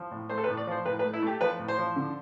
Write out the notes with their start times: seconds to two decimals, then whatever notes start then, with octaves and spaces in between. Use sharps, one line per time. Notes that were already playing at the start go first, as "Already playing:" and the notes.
Already playing: F3
0.11 A2
0.30 A3 C5
0.38 A4
0.44 B4
0.48 A2
0.57 D5
0.67 F3 C5
0.85 A2 B4
0.99 B4
1.04 A3
1.13 E4
1.22 A3 G4
1.41 F3 B4
1.59 A2
1.68 C5
1.78 F3
1.96 D3